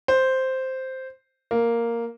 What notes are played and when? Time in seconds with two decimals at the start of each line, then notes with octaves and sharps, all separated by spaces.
0.08 C5
1.51 A#3